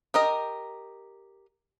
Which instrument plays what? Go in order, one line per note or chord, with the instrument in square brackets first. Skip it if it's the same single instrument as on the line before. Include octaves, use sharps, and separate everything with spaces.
[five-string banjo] G4 A#4 D#5